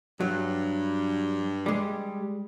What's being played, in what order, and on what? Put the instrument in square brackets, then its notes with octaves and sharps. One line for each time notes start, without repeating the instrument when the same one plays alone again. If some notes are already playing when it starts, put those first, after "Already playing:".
[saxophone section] G2 [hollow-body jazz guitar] F#3
[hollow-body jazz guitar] G3 G#3